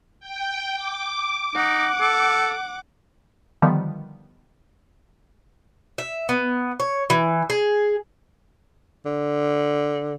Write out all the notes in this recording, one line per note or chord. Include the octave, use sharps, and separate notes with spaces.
G5
D6
D#4 F#5
A4
D3 D#3 F3 G3 B3
E5
B3
C#5
E3
G#4
D3